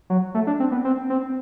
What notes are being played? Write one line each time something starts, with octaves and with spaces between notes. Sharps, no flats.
F#3
A3
D4
C4
B3
C4
C4